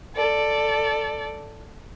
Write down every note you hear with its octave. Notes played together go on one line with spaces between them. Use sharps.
A4 D5